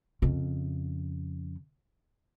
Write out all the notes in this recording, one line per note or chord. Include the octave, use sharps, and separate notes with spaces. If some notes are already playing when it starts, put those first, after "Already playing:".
F2 C#3